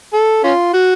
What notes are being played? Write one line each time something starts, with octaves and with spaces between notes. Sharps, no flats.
A4
C#4 F4
F#4